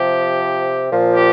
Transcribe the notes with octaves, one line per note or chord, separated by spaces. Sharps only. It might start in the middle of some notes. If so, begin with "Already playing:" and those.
Already playing: C3 F3 G4
A#2 F3
G4